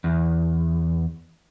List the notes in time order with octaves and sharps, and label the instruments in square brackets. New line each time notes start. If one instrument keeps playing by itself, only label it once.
[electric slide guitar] E2